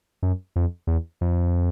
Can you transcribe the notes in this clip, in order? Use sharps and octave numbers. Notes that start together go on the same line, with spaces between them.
F#2
F2
E2
F2